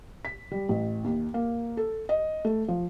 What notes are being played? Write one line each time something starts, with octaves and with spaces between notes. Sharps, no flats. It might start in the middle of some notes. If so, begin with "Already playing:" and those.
B6
G3
A1
D#2
A#3
A4
D#5
A3
F3